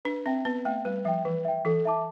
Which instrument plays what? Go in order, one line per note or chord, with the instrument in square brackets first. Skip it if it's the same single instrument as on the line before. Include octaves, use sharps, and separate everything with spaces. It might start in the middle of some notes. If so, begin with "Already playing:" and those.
[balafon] D4 [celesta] B4
[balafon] C4 [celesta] E5 G5
[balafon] B3 [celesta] B4
[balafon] A3 [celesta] E5 G5
[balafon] G3 [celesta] B4
[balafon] F3 [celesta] E5 G5
[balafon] E3 [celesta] B4
[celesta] E5 G5
[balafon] E3 [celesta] A4
[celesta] E5 A5 D6